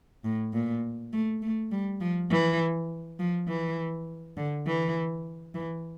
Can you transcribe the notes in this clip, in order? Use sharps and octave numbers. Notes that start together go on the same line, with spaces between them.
A2
A#2
A3
A3
G3
F3
E3
F3
E3
D3
E3
E3